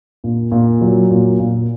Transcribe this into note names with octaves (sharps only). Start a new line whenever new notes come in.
A#2
A#2
F#3
A#2
A#2